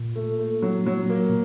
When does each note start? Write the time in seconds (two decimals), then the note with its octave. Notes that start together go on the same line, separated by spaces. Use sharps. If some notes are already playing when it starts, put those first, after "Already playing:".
Already playing: A#2
0.16 A3
0.39 A3
0.62 F#3
0.86 F#3
1.09 A#3
1.29 A#2